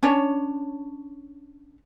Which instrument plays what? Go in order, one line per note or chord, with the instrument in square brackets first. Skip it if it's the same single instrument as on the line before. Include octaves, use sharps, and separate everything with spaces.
[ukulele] C#4 D4 C#5